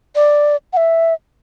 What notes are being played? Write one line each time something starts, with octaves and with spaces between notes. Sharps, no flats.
D5
F#5
E5